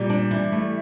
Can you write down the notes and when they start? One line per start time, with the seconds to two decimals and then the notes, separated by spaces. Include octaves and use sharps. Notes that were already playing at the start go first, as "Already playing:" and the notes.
Already playing: A#2 G3
0.10 D4
0.31 E3
0.52 A3